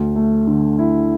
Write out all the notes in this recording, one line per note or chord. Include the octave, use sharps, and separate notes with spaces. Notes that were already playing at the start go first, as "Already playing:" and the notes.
Already playing: D2
A3
D3
E4